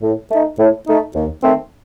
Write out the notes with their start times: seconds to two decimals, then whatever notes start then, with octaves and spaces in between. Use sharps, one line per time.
0.02 A2
0.30 A3 D#4
0.58 A2
0.87 A3 D#4
1.15 D#2
1.42 D#3 A3 C4